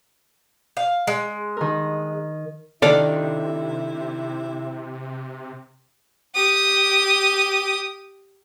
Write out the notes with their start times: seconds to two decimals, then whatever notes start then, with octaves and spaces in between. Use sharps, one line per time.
0.77 F5
1.07 G#3
1.57 D#3 A#4
2.82 C3 D#3 D4 E4 A4 D5 F5
6.35 G4 D#6